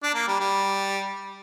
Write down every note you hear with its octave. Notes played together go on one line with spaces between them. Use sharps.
D4
A#3
G3
G3